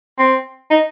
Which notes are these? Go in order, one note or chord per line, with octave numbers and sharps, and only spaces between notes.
C4
D#4